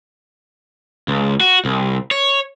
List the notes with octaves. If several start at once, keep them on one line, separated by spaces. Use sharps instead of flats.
C#2
F#4
C2
C#5